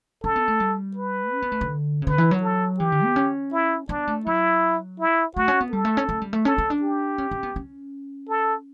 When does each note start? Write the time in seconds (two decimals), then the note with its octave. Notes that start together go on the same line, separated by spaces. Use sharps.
0.24 C#4 A4
0.36 B3
0.48 A3
0.60 G3
0.97 B4
1.33 C#4
1.42 B3
1.52 A3
1.61 D3
2.02 C#3
2.07 D3 B4
2.18 E3
2.31 F#3
2.43 A4
2.79 E3 G4
2.92 D3
3.04 B3
3.16 C#4
3.53 E4
3.89 B3 D4
4.07 A3
4.26 F#3 E4
5.00 E4
5.36 A3 F#4
5.48 C#4
5.61 B3
5.72 G3 A4
5.85 A3
5.97 C#4
6.09 A3
6.22 G3
6.33 A3
6.45 C#4 A4
6.58 C#4
6.70 D4
6.82 G4
7.18 C#4
7.31 C#4
7.43 B3
7.56 C#4
8.29 A4